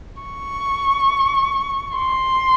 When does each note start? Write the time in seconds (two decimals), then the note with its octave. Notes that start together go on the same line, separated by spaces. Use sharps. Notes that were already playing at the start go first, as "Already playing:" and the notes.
0.22 C#6
1.97 C6